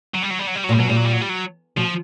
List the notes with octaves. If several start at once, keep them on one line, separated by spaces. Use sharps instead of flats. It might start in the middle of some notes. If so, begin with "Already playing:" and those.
F#3
G3
F#3
G3
F#3
G3
F#3
A#2 G3
B2 F#3
A#2 G3
F#3
G3
F#3
G3
F#3
B2 F3